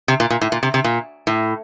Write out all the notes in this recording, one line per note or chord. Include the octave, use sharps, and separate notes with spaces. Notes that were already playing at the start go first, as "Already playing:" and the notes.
C3
A#2
A#2
A2
A#2
C3
C3
A#2
A2